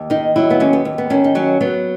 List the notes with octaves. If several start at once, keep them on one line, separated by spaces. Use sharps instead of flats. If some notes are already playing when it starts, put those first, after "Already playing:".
Already playing: D#2
D#3 D#4
F#3 E4
B3
D#2 C#4
B3
D#2
B3
D#3 C#4
D#4
F#3 C#4
F#3 B3